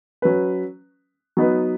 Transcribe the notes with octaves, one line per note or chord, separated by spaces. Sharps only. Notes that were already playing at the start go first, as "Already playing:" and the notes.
F#3 C#4 B4
F#3 B3 D#4 B4